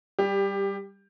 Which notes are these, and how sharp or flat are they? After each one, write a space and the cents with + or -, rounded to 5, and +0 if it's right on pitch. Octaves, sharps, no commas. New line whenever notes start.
G3 +0 G4 +20